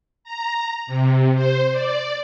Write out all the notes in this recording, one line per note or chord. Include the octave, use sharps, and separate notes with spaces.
A#5
C3
C5
D5